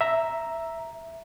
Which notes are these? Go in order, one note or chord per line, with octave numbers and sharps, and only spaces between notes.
E5 A#5